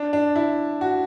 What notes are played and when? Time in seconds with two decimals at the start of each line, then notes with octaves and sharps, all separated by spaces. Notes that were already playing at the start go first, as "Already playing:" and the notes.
Already playing: D4
0.13 D4
0.36 E4
0.81 F#4